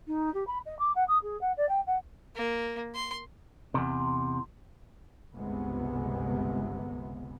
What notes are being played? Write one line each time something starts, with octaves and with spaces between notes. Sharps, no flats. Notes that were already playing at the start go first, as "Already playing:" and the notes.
D#4
G4
B5
D#5
D6
F#5
D#6
G#4
F#5
D5
G5
F#5
A#3
C6
E2 C3
G1 C#2 C3 G#3 B3